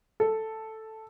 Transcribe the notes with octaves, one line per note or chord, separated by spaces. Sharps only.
A4